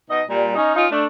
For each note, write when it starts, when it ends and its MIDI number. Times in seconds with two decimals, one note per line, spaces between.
0.10 0.22 47
0.10 0.22 63
0.10 0.22 75
0.29 0.53 46
0.29 0.53 55
0.55 0.72 61
0.55 0.72 63
0.76 0.86 61
0.76 0.86 63
0.76 0.86 65
0.91 1.05 57
0.91 1.05 62